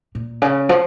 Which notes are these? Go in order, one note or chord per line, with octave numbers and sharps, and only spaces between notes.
A#2
C#3
F3